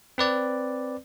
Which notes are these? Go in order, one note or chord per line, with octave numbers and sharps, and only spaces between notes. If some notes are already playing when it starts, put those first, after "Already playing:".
C4 B4 D5